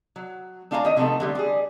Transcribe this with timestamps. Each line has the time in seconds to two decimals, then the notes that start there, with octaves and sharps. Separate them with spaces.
0.16 F#3
0.71 A3 D4 F4 F5 G#5 A#5
0.85 D#3 D#5
0.97 C3 F3 A3 B3 D#4 A4
1.20 D3 G3 A3
1.35 G3 G#4